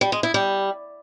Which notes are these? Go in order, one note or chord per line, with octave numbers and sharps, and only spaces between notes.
G3
G#3
E4
G3